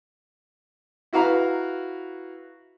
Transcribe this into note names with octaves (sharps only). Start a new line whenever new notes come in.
E4 F#4 B4 F5 A#5